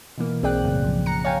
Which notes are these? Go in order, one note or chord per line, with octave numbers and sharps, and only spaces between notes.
B2 E3 A#3
B1 C4 G#4 D5 G5 F#6
F#2 A2 C#3
B1 F3
F#5 A#5 C#7
C#5 F5 G5 G#5